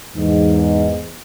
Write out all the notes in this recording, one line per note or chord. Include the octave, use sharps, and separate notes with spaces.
E2 G#2